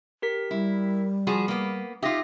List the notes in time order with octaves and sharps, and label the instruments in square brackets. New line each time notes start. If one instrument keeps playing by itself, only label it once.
[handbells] G4 A#4 B6
[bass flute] G3 [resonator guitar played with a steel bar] E4
[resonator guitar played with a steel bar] F3 F#4 G#4 [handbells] B5
[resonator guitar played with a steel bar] A#3 B3
[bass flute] D#4 [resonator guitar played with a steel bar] F4 G4 [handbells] E5 D#6 A#6